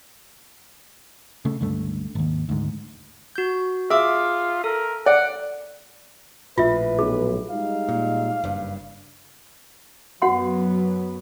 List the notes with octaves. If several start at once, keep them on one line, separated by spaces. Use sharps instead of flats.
C#3 A3
G1 C#2 G2 A3
G#1 D#2
D2 G#2
F#4 G6
F4 G#4 E5 D6
A4 A#4
D5 F#5
A#1 A2 F4 B4 E5
B1 G#4
G3 G#3 D#4 F5
A#2
F#1 G2
F#2 F#3 B3 F#4 F#5 C6